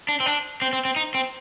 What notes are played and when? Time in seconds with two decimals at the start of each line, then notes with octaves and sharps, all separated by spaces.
0.09 D4
0.20 C4
0.26 D4
0.62 C4
0.73 C4
0.85 C4
0.96 D#4
1.15 C4